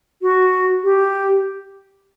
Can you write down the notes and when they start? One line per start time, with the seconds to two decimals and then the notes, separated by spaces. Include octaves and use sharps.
0.22 F#4
0.84 G4